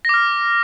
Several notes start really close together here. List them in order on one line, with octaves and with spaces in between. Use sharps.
A#6 D6 F6